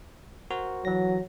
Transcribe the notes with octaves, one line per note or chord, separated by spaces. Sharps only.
F#4 A#4 C5
E3 F#3 A#6